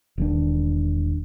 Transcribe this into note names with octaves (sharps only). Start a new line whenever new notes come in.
E1 D#3 D4